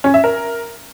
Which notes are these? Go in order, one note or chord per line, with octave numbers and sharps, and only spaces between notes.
C#4
E5
A#4